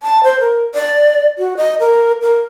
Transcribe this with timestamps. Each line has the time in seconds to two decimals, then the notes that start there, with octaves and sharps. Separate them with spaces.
0.03 A5
0.24 C5
0.40 A#4
0.75 D5
1.38 F#4
1.57 D#5
1.80 A#4
2.22 A#4